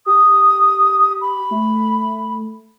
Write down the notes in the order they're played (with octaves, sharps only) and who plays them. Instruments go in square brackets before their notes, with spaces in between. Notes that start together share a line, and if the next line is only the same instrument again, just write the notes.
[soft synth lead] G4 [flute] D#6
[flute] B5
[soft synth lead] A3